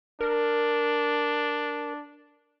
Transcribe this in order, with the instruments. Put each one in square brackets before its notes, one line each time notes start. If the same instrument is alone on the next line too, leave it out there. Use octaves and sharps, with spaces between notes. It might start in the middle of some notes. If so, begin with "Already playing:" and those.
[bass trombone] D4 [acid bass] A#4